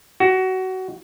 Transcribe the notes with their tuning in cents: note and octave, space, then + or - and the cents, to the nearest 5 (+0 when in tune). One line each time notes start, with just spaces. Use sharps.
F#4 +20